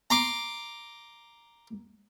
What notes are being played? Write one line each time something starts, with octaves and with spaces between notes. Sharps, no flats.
A#5 C6 D6